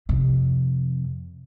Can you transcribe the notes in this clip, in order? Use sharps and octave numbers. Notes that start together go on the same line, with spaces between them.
F2 C3